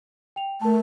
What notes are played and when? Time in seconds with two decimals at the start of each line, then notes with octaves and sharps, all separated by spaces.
0.36 G5 F7
0.61 A3 A#4 A5